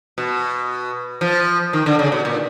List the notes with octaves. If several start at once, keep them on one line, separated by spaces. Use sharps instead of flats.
B2
F3
D#3
D3
C#3
B2
A#2